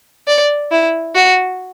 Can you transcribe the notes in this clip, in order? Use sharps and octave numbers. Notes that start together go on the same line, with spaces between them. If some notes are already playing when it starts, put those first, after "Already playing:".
D5
E4
F#4